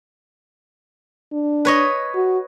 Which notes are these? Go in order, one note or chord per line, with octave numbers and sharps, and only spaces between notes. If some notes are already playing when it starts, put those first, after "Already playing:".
D4
B4 C#5 D#5
F#4